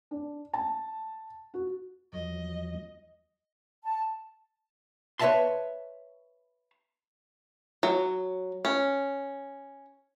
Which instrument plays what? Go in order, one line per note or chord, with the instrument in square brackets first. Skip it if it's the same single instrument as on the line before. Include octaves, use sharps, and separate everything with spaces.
[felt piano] D4
A5
F#4
[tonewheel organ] E2 F3 F#3 [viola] D#5
[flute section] A5
[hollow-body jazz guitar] B4 C#5 D#5 E5 A5 C6
[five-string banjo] F#3
C#4